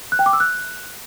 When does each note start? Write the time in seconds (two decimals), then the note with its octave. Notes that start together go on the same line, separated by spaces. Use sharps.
0.12 F#6
0.19 G5
0.26 D6
0.33 E6
0.40 F#6